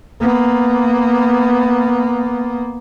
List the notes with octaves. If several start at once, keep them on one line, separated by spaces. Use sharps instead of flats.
A#3 B3